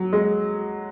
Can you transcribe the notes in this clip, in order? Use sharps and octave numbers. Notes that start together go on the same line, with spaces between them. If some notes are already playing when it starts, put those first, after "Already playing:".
Already playing: F#3
G#3